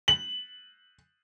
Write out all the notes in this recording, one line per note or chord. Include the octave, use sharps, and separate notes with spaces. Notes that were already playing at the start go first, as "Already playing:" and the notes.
F#7